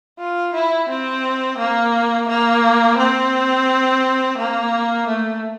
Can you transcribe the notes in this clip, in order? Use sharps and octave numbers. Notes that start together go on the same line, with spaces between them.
F4
E4
C4
A#3
A#3
C4
A#3
A3